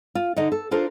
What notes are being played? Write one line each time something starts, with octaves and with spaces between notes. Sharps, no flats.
F4
D3 D#4 D#5
A4
D4 F4 A4 A#4 C5